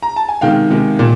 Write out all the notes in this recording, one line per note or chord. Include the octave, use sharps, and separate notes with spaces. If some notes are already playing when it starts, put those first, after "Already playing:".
A#5
A5
G#5
C3 D#3 G#3 F5 G5
C3 D#3 G#3
A#2